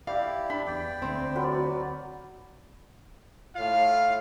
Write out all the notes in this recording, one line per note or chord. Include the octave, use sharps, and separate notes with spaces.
E4 G4 D5 F5
D4 B5
E2 D5 G5
D2 C4 C6
F#3 A#4 B4
F#4 D5
A2 F4 F5